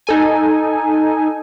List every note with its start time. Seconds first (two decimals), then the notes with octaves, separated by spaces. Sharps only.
0.07 D#4 A4 G#5